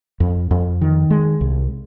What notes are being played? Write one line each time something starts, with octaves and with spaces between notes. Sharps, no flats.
F2
F2
D#3
G#3
C2